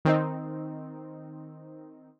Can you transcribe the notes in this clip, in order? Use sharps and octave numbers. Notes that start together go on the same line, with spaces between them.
D#3 C4 D#4